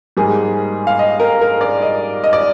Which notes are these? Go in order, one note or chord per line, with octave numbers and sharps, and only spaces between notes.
G#2 G3 A#3 G#4
F5
D#5
A#4
A#4
D5
D#5
D#5
D5